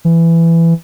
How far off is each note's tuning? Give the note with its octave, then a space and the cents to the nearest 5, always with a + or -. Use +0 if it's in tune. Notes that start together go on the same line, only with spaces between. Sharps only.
E3 +15